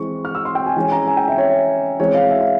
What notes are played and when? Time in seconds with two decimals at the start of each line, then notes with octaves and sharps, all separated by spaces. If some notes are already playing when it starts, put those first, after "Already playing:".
Already playing: E3 G#3 C4 C#6
0.25 F6
0.35 E6
0.45 C6
0.55 G5
0.66 G#5
0.76 E3 G#3 C#4 G#5
0.92 A#5
1.07 G#5
1.17 G5
1.28 E5
1.38 C#5
2.00 E3 G#3 C4 C#5
2.15 F5
2.30 E5
2.41 F5